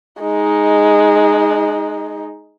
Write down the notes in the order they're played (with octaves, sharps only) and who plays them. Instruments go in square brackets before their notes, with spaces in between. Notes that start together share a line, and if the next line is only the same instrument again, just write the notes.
[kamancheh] G#3 D#4